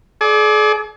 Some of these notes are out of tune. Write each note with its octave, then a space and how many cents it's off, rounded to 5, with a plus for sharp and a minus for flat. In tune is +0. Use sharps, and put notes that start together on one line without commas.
G#4 +45 D5 +0